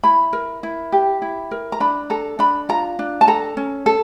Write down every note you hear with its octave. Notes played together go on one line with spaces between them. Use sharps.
E4 B5
A#4
E4
G4
E4
A#4
A#5
D4 B5
A4 A#5
D4 B5
F4 A#5
D4
A5
A4 A#5
C#4
A4